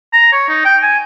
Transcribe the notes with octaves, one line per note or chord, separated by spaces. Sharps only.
A#5
C#5
D#4
G5
G#5